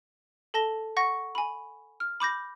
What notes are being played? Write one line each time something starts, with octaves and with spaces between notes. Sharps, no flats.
A4 A5 A#6 G7
F#5 C#6 A#6
G#5 B5
F6
B5 D6 G6 A#6